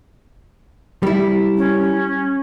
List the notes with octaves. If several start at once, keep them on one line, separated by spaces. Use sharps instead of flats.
G3 E4
C#4